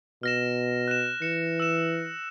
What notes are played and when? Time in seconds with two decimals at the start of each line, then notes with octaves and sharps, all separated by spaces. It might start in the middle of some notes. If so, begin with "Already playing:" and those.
0.23 B2 F6 A#6 E7
0.88 F#6 E7
1.22 E3 C#7 E7
1.60 E6 E7